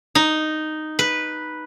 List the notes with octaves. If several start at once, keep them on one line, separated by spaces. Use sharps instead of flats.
D#4
B4